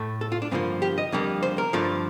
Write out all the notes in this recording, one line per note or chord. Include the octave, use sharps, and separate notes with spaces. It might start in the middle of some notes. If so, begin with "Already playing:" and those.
Already playing: A2 A3
A4
F4
D4
G2 D3 F3 A#3 C4
G4
D#5
F2 D3 G3 A#3
C5
A#4
G2 D3 F3 A3